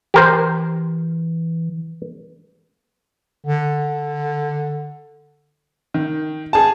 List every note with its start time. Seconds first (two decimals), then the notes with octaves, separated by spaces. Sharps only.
0.14 E3 G4 A#4 C5
3.46 D3
5.94 D#3
6.53 G#4 A5